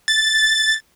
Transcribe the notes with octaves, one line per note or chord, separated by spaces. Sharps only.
A6